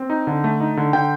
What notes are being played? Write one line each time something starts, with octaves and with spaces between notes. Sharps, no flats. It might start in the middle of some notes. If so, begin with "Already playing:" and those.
Already playing: C4
D#4
D3
A3
D#4
D3
D3 G5